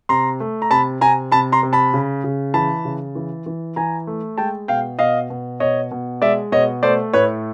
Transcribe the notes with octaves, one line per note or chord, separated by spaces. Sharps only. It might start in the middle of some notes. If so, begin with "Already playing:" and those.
C3 A#5 C6
A3
A#5
C3 A5 B5
C3 G#5 A#5
C3 A5 B5
A#5 C6
C3
A5 B5
C#3
C#3
E3 A5 B5
C#3
E3
E3
E3 G#5 A#5
A3
G#3 G5 A5
B2 F5 G5
B2 D#5 F5
B2
B2 C#5 D#5
B2
G#3 D5 E5
B2 C#5 D#5
A3 C5 D5
A2 B4 C#5